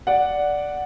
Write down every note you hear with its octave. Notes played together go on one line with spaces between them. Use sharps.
D5 F#5